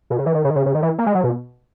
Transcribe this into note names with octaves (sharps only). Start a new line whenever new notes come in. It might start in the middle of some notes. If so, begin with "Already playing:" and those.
B2
C#3
E3
D#3
C#3
D#3
C#3
C#3
D#3
E3
A#3
G#3
F#3
B2